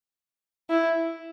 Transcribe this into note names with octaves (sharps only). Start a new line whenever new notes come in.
E4